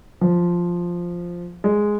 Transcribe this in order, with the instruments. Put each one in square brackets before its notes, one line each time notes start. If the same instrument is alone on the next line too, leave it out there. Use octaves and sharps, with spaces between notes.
[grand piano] F3
G#3